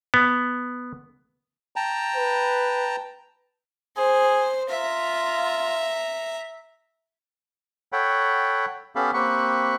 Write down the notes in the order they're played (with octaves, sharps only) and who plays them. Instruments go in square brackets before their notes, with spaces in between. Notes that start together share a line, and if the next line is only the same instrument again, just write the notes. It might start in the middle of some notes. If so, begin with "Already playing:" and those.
[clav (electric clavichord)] B3
[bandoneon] G5 A5 A#5
[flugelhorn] B4
[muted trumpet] G#4 [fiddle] C5
[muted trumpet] F4 [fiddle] E5 A#5
[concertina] A4 C#5 F#5 G5 B5
B3 C#4 G4 A4 F5 B5
A#3 C4 G4 B5 C#6 F#6